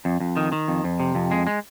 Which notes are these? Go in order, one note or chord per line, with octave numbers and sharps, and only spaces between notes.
F2
F2
D#3
D#3
F2
F2
C3
F2
G#3
G#3